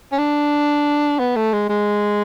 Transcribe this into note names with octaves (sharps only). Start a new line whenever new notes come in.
C#4
D4
B3
A3
G#3
G#3